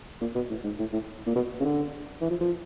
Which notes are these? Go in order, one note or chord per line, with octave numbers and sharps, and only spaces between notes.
A#2
B2
A2
G#2
A2
A2
A#2
B2
C#3
D3
E3
F3
F3